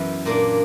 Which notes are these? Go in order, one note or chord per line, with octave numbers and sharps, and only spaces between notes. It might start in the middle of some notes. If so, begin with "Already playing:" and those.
Already playing: F#2 E3 B3 E4
A#2 A#3 D4